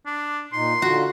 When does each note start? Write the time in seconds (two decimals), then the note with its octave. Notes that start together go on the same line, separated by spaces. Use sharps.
0.06 D4
0.53 A#2 D#4 C6
0.82 D3 F4 F#4